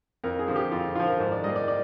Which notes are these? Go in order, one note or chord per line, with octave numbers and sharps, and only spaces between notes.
F2 A#4
G#4
D3 F3
G4
F2 F4
D3 F3 F4
A#4
G#2 C5
D5
G3 A#3 D#5
D5
D5